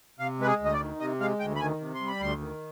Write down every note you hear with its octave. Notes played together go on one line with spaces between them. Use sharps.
C3 F5
G#3 B4
G#4
D2
D#5
D5
D#3
C3 D#5
G#3 F5
D2 G5
B5
D#3 G#5
C3
C6
G3
B5
D2 C6
D#3